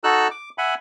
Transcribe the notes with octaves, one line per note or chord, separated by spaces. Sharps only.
D#4 F#4 A4 E6 F#6
D6
E5 F#5 G#5 B5